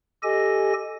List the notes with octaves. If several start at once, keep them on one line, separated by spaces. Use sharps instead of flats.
G4 A4 D#5 G#5 A#6